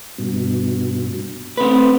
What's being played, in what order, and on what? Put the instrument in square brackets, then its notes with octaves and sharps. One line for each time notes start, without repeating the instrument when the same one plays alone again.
[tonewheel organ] G2 B2
[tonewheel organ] A3 [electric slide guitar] C4 B4